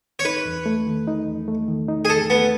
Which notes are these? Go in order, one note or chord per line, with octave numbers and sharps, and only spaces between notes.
C#5
D#4 B4
E2
A3
D#3
D#4
E2
A3
D#3
D#4
G#4
E2 A4
A3 B3